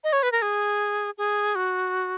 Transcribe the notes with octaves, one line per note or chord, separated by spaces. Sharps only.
D#5
C#5
B4
A#4
G#4
G#4
F#4